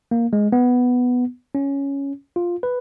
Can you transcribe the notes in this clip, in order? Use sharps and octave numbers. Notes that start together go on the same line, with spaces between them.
A#3
G#3
B3
C#4
F4
B4